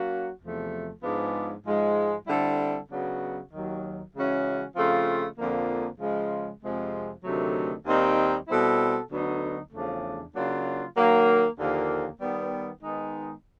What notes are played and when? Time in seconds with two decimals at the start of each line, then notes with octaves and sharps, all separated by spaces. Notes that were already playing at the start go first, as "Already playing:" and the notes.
Already playing: F#3 A#3 C#4 F#4
0.41 E2 C3 F3 A3
1.03 G#2 F3 G#3 B3 D4
1.66 G#2 F3 G#3
2.27 D3 G3 C4 E4 A4
2.90 C#3 F#3 B3 D4 F#4
3.52 D#2 D#3 F#3
4.14 C#3 E3 G#3 C#4 F#4
4.76 C#3 F3 A3 C4 F4
5.38 F2 D3 F3 A#3
5.99 C#3 F3 G#3
6.62 F2 C3 F3 G#3
7.24 D2 C3 D#3 F#3 A3
7.86 D#2 D#3 G3 C4 D#4
8.48 B2 G3 C4 E4 A4
9.11 D2 D3 F#3 B3 D#4
9.72 E2 C#3 F3 A3 D4
10.35 C#3 F#3 A#3 D4 F4
10.96 D#3 F#3 A#3
11.58 D#2 D3 F3 A#3
12.21 D#3 G3 B3
12.83 D#3 G#3 B3 D#4